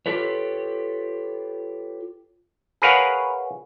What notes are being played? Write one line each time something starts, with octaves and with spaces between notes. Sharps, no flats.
F4 G4 A4 B4 C#5
G#4 A#4 B4 C#5 F5 F#5